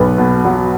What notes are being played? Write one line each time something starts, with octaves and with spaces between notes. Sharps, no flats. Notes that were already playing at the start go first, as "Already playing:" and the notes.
Already playing: B1 B4
B2
F#3